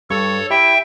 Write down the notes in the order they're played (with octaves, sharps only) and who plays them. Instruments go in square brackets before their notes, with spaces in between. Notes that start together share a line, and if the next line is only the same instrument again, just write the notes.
[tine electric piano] G2 C#6 [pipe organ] A4 C#5
[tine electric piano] E4 G4 [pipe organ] E5 G5